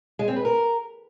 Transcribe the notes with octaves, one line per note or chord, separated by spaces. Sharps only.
G#3
C4
B4
A#4